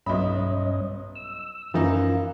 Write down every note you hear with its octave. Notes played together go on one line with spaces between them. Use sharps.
B1 G2 C#4 D#5 E5 B5
E6
F#2 E3 F3 D#4 F4